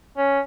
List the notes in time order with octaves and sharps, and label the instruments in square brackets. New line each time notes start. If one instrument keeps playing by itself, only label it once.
[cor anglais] C#4